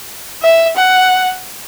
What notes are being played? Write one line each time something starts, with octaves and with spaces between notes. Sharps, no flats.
E5
F#5